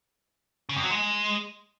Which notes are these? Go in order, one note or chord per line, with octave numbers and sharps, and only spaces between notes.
C#3
F2
F#3
G#3